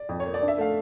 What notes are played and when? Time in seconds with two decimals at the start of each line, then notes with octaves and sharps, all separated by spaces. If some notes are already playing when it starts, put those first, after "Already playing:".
Already playing: D5
0.09 F2
0.20 C#5
0.26 A#3
0.34 D5
0.42 D4
0.48 E5
0.58 A3 F5